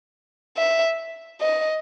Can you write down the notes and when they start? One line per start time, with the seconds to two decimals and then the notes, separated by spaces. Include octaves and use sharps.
0.57 E5
1.41 D#5